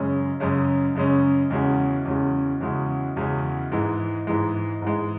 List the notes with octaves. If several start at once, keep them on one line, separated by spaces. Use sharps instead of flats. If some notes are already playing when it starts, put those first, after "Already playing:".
Already playing: F#2 C#3 G#3 C#4
F#2 C#3 G#3 C#4
F#2 C#3 G#3 C#4
E2 C#3 G#3 C#4 F#4
E2 C#3 G#3 C#4 F#4
E2 C#3 G#3 C#4 F#4
E2 C#3 G#3 C#4 F#4
G#2 E3 G#3
G#2 E3 G#3
G#2 E3 G#3